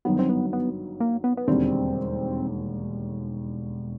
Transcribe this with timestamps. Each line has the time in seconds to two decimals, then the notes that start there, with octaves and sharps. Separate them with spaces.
0.05 G1 F#2 D#3 F#3 B3
0.19 C4
0.29 B3
0.53 B3
1.00 A#3
1.24 B3
1.37 B3
1.47 E1 D#2 D3 G3 C4